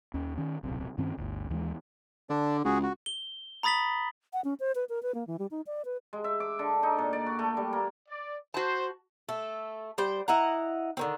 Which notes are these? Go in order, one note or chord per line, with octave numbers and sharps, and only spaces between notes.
D#2 C#4
D#3 C#4
D1 B1 C3
G2 D#3 C4 C#4
G1 D2
D#2 E3 F3 G#3
D3 D4 D5
C#2 F#4 G#4
F#4
G7
A#5 B5 D#6 A6 B6 F#7
F#5
C#4
C5
B4
A#4
B4
A#3
E3
G3
D#4
D5
B4
G#3
E5
D6
D3
D#4
A#2
D5
F#4
A3
G3
A#3
D5
F#4 C5 A5
A3 A4
G3 C5 G5
E4 D#5 F#5 A#5
D3 D#3 C4